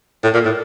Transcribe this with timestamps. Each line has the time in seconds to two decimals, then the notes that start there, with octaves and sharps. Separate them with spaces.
0.24 A2
0.34 A#2
0.45 A2